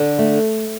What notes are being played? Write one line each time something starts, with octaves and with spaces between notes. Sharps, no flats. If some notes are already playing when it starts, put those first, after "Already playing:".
Already playing: D3
A3